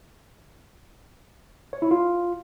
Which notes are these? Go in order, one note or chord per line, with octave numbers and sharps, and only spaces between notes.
C#5
E4
F4